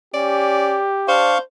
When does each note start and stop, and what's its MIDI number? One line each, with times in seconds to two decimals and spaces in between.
0.14 0.79 61
0.14 1.38 67
0.14 0.88 74
1.08 1.36 62
1.08 1.39 72
1.08 1.38 77
1.08 1.38 85